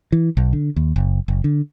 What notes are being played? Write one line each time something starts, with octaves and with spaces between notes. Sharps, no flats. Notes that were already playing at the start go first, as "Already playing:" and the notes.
E3
B1
D3
D#2
F#1
F#1
D3